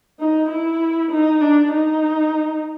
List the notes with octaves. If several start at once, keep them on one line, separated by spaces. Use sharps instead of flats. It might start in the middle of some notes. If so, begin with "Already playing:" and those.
D#4
E4
D#4
D4
D#4